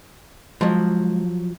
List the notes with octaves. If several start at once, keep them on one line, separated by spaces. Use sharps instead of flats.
F3 F#3 G#3